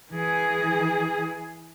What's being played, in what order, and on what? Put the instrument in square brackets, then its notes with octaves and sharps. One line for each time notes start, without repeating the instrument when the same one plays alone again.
[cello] E3 G#4